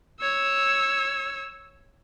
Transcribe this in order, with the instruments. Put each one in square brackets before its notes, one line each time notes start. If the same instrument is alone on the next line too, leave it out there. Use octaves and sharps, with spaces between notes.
[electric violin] C#5 E6